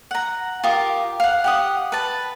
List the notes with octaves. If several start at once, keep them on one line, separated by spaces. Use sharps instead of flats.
F#5 A#5
F4 G4 A#4 D#6
F5 F#5
G4 F#5 D#6
B4 A5